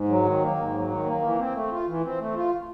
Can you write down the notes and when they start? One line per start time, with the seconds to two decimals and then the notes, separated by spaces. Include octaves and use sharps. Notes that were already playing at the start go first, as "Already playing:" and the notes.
Already playing: G#2
0.09 F#3
0.25 D#3
0.42 A#3
0.57 G#2
0.74 F#3
0.90 D#3
1.06 A#3
1.22 E3
1.38 C4
1.54 A3
1.71 F4
1.87 E3
2.04 C4
2.19 A3
2.35 F4